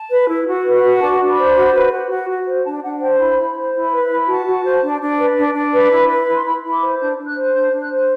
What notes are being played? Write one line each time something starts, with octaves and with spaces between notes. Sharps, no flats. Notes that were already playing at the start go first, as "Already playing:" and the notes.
Already playing: A5
B4
E4
F#4
B4
F#4
D4 A5
D4
B5
C5
F#4
B4
F#4
F#4
F#4
C5
D4 A5
D4 F#5
C5 G5
E4 B5
E4
C5
E4
B4
E4
F#4 A5
F#4
C5
D4
D4
B4
D4
D4
B4
E4
B4
E4
C6
E4 B5
E4
D6
C5
D4 G6
D4
F#6
C5
D4 G6
D4
F#6
C5